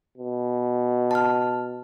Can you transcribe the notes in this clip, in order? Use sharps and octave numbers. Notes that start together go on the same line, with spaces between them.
B2
A5 F6